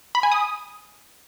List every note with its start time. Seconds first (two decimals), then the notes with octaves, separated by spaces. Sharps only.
0.15 B5
0.23 G#5
0.32 D#6